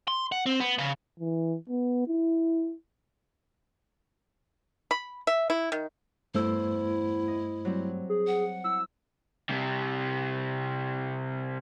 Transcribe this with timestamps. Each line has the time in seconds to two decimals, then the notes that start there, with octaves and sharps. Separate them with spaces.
0.08 C6
0.32 F#5
0.46 C4
0.60 B3
0.78 C#3
1.20 E3
1.69 B3
2.08 E4
4.91 B5
5.27 E5
5.50 E4
5.72 D#3
6.34 E2 G2 A3 E4 C5 E6
7.28 D#5
7.65 F#3 G3 C4
8.09 G#4
8.27 F#5
8.64 E4 E6
9.49 C3 G3